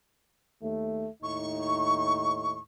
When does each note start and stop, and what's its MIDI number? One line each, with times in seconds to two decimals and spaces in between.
0.63 1.08 39
0.63 1.08 57
1.23 2.58 39
1.23 2.58 45
1.23 2.58 63
1.23 2.59 85